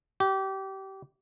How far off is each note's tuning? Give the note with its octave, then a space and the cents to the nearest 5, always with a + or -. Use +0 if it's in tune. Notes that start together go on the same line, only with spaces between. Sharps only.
G4 -25